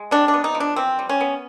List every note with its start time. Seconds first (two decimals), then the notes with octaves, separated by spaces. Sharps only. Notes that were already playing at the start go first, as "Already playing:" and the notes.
Already playing: G#3
0.11 C3 D4
0.28 D4
0.34 B3
0.44 D#4
0.55 F3
0.60 D4
0.76 E3 C4
0.99 G3
1.09 C#4
1.21 B3